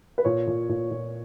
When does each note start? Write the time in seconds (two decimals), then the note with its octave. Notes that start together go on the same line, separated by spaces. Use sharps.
0.18 B4
0.25 A#2 C#5
0.47 A#2
0.69 A#2
0.91 A#2